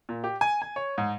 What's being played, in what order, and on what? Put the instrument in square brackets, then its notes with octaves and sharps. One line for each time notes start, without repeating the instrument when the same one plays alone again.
[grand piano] A#2
G4
G#5
G#5
C#5
G#2